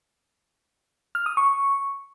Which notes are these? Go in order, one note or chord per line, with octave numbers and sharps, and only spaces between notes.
F6
D#6
C#6